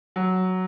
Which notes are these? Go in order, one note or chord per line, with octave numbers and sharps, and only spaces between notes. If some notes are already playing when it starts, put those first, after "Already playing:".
F#3